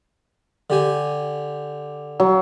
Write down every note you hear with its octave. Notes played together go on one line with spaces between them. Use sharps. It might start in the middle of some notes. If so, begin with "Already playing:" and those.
D3 G4 G#5
F#3